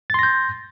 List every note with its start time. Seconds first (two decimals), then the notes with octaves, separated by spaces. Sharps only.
0.10 A6
0.14 C6
0.19 A#6
0.23 G6